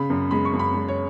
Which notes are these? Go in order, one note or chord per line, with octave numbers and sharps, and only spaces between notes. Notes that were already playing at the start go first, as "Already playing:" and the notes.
Already playing: C#3 B5
F#2
G#3 B5
C#6
F#2
B5
G#3
C#5